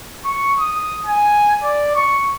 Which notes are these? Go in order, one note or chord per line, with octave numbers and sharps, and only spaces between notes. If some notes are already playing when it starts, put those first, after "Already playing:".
C#6
D#6
G#5
D5
C#6